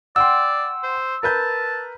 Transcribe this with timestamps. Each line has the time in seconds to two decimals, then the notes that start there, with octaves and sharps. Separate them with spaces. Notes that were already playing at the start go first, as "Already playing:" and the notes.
0.16 D5 F#5 G5 C6 E6
0.83 C5
1.23 A#4 B4 A5 G6